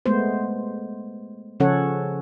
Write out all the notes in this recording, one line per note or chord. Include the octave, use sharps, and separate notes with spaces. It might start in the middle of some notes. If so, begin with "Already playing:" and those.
G#3 A3 B3 C5
C#3 F3 C#4 A4 C#5 F#5